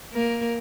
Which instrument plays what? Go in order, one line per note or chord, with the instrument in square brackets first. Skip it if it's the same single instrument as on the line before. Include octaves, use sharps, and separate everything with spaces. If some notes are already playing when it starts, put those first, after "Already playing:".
[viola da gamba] A#3 A#4